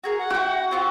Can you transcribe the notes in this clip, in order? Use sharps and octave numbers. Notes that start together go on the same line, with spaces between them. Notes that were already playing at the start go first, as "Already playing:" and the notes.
F#4 G#4 A#4
F#5
E4 F#4 G5
C4 F4 G4